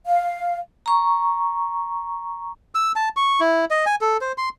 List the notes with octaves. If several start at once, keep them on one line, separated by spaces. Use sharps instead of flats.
F5
A#5 C#6
E6
A5
C#6
E4
D#5
G#5
A4
C5
C6